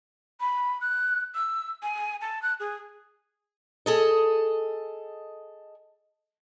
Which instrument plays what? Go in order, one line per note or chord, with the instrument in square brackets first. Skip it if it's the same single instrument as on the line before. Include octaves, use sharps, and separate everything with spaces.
[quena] B5
F#6
E6
G#5
A5
F#6
G#4
[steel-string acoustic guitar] G#4 A4 D#5